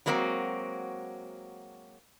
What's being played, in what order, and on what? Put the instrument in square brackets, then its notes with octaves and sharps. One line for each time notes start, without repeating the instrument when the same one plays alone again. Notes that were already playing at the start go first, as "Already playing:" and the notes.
[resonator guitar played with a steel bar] F#3 G#3 A#3 C4 F#4